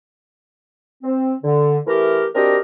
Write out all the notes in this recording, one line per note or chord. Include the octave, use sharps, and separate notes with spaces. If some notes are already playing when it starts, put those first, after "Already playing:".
C4
D3
E3 A3 G4 A#4
C4 D4 F#4 G4 A#4 D#5